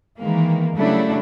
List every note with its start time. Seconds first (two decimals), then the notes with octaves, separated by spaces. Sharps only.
0.19 D#3 E3 G#3 A#3
0.76 C#3 F#3 G3 A3 D4 E4